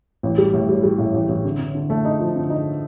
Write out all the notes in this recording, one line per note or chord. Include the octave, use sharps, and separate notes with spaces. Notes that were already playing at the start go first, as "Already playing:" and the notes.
A1
G3
A2
G3
G3
A2
A1
A1
D3
D3
D3
A3
D#4
F3
D3
D#4